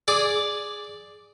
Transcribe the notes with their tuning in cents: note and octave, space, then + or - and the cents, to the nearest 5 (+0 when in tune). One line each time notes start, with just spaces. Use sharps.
G#4 +0 D5 +0 D6 -10